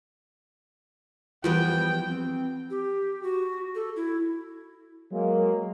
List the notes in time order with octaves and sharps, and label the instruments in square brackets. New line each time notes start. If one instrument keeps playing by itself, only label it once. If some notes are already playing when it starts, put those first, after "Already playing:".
[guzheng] E2 G3 B3 [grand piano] F3 [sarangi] G5
[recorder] C4
G4
F#4
A4
E4
[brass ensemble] F#3 G#3 A#3